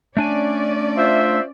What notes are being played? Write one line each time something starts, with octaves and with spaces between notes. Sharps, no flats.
A3 C#4 D4 D5 G#5
F4 C5 E5